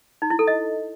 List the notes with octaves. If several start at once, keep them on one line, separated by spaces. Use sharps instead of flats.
D#4
E4
A4
D#5